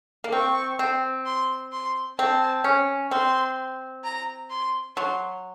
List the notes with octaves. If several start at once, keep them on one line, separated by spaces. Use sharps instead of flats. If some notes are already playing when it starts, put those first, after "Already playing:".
A#3
C4 C#6
C4
C6
C6
C4 A5
C#4
C4 C6
A#5
C6
F#3 C6